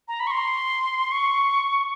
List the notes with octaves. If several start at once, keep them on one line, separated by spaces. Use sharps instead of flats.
A#5
B5
C#6
C6
C#6